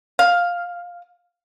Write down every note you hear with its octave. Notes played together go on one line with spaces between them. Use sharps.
F5